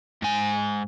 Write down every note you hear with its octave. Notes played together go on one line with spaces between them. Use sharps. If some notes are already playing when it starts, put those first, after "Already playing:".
G#2 G#5